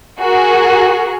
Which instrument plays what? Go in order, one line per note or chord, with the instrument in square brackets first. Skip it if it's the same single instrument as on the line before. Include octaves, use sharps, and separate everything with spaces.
[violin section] F#4 G#4 A#4